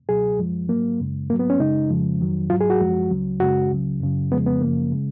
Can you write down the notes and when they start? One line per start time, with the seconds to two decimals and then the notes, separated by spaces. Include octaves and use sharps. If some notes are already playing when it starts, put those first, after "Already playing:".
0.09 C#2 B2 F#3 G#4
0.38 F#2 F3 G#3
0.69 G#2 F#3 A#3
0.99 F#2 C#3 G#3
1.30 G#2 A#3
1.33 F#3
1.39 B3
1.50 C#4
1.59 F#2 C#3 G#3 D#4
1.89 F2 C#3 F3 G#3
2.20 F2 D#3 F#3
2.50 G#2 F#3 F4
2.60 G#4
2.70 F#4
2.80 F#2 F3 G#3
3.11 C#2 C#3 F#3
3.40 F#2 C#3 G#3 F#4
3.70 C#2 C#3 F#3
4.00 F#2 C#3 F#3
4.32 F2 C#3 F3 G#3 B3
4.46 B3
4.61 F#2 C#3 F3 A#3
4.92 C#3 G#3